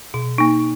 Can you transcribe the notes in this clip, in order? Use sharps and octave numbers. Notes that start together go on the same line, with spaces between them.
B2
A#3 D#4